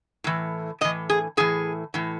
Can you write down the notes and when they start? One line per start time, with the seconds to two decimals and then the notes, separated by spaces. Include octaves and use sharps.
0.24 A2 E3
0.81 A2 D#5
0.85 E3
1.10 G#4
1.37 A2 E3 G#4
1.94 A2 E3